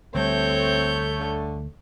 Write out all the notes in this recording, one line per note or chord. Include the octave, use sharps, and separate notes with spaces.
D2 G3 A3 C4 A4 C#5 G6
D3